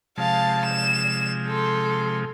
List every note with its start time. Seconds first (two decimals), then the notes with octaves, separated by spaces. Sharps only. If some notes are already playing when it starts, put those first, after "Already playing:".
0.18 C3 F3 G#3 F5 A5
0.65 E7
1.47 A4 C6